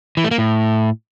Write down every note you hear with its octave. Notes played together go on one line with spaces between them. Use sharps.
E3
A3
A#3
A2